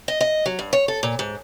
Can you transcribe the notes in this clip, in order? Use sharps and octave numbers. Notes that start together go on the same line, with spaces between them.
D#5
D#5
F#3
G2
C#5
A4
A#2
G#2